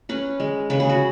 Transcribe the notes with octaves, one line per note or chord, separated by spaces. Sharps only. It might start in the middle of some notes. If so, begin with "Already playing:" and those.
C#4 B4
G#3
C#3 B4
G#4
F#4